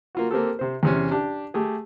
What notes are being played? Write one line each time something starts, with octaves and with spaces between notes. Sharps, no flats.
A#3 F4 F#4
A#3 C4 G4 A4
C3 C5
E2 C3 C#4
D4 G4
A3 G4 G#4